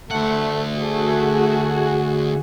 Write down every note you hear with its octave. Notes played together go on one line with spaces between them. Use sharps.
D2 A3 F#5
A3 F#4 G#4